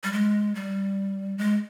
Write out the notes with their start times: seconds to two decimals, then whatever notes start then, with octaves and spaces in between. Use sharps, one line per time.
0.04 G3
0.12 G#3
0.55 G3
1.38 G#3